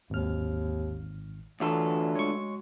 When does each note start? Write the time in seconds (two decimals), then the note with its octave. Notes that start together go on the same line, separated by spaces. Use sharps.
0.10 G#1 D#2 F6
1.60 D2 E3 F#3 F4 A4
2.15 G#3 C#5 C#6